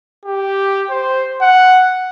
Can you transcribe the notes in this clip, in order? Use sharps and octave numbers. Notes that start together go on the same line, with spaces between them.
G4
C5
F#5